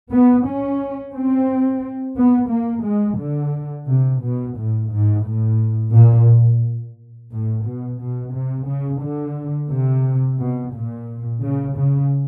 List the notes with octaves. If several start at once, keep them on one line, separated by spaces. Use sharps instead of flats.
B3
C#4
C4
B3
A#3
G#3
D3
C3
B2
A2
G#2
A2
A#2
A2
B2
B2
C3
C#3
D3
C3
B2
A#2
C#3
C#3